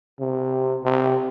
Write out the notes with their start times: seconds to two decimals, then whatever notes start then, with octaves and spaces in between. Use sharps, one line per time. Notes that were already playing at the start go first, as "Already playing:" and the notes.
0.20 C3
0.84 C3